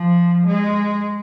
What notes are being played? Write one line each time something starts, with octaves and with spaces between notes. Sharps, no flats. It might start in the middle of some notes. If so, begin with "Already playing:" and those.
Already playing: F3
G#3